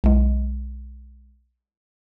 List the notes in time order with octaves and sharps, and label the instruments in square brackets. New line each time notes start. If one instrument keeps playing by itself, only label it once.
[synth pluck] B1 G#3